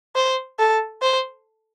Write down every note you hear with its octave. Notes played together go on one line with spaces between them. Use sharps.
C5
A4
C5